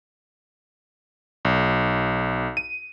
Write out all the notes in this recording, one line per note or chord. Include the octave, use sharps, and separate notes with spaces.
B1
D#7